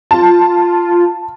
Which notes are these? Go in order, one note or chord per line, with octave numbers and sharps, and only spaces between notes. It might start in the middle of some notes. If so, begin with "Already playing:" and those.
F4 A5